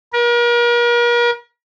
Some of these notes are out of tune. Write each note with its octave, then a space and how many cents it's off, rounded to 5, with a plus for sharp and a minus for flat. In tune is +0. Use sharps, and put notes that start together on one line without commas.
A#4 +40